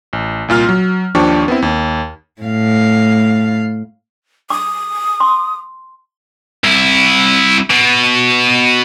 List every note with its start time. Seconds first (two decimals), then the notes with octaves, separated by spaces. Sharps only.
0.13 A1
0.48 C2 A#2 F4 F6
0.69 F#3
1.15 D#2 F3 D4 G4 C#6
1.48 B3 C4 E4
1.62 D#2
2.41 A2 F5
4.50 D6 D#6
5.20 C6
6.64 C2 E4
7.70 B2